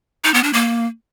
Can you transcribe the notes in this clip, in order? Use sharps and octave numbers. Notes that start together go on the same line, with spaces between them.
D#4
B3
D4
A#3